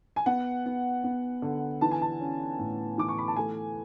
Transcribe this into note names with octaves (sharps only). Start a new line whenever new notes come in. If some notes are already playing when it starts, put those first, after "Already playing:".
G#5
B3 F#5
B3
B3
D3
E3 A5
G#5
A5
C#4
A2
E3 D6
C#6
B5
A5
A3 G#5